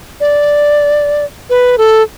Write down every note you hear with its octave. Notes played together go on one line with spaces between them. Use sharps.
D5
B4
A4